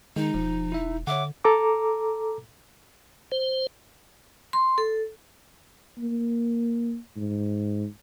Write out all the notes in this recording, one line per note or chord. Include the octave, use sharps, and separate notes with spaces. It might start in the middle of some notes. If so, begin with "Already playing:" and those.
D#3 G#3 D#4
E1 F3
E4 E5
D3 C#5 E5 F#5 D6
A4 A#5 D6
C5
C6
A4
A#3
G#2